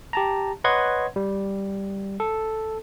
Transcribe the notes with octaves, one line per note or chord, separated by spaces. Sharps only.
G4 A5 A#5
B4 C#5 D#5 F#5 C6 G#6
G3
A4